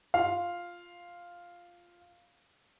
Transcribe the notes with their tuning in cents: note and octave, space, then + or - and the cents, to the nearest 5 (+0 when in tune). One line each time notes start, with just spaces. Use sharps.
F4 +0 F5 +0